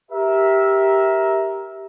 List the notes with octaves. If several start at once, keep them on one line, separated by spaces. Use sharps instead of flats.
G4 A#4 E5